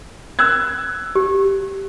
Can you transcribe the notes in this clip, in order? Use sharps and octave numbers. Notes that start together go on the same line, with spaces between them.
E6 F#6 G#6
G4